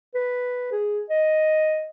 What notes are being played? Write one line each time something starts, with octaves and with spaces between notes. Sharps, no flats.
B4
G#4
D#5